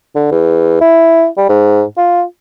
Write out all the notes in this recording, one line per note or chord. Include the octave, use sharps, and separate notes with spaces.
D3
E2
E4
G3
G#2
F4